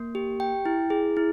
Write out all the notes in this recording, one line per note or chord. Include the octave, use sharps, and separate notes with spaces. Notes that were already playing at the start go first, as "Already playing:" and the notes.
Already playing: A#3
G4
G5
E4
G#4
E4